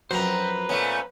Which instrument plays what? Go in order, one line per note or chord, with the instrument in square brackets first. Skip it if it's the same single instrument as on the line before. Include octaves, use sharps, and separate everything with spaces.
[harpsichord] F#2 F3 F#3 [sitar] C4 [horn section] B4 [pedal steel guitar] C5 A#5
[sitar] A#2 A3 C#4 [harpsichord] B3